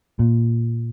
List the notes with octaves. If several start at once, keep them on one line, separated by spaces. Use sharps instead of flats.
A#2